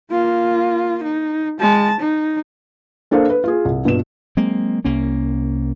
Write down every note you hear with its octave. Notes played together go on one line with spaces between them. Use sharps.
A#3 F4
D#4
G#3 A5
D#4
A#3 D4 A4 C5 F5
B4
F4 G#4
C2
G2 B2 F4 E7
F#3 G#3 A#3 C4
C2 A#3 C#4